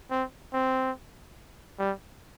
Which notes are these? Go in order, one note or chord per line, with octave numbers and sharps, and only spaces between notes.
C4
C4
G3